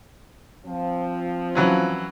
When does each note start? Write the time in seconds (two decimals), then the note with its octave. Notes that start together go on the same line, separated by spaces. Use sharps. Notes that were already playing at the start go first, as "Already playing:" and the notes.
0.66 F3 C4
1.55 E3 F#3 C#4